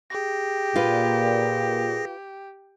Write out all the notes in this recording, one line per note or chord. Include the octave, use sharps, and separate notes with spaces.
G4 G#4 A#6
A#2 F4 B4